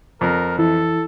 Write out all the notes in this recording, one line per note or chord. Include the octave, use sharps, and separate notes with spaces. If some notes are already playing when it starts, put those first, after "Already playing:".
F2 A#4
E3 E4 A4